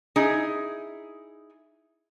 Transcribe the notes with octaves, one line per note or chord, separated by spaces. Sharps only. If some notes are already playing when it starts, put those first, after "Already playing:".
D#4 E4 G#4